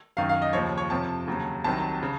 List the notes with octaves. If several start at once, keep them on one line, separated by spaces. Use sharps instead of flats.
F#2 D#3 F#3 F5
F5
D#5
D#2 C#3 F3 C#5
C#5
F2 C3 F3 A5
D#2 C#3 F#3
C2 C3 D#3 F#3 A5
C#3